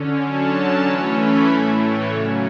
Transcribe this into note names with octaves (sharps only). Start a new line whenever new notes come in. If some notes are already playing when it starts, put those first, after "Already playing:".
Already playing: D3 C#4
D3 F#3 C#4 A5
E3 A3 C#4 B5
B5
A2 E3 A3 E5
C#5
C#3 F#3 C#4 D5